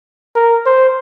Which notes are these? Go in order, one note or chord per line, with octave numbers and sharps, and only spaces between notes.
A#4
C5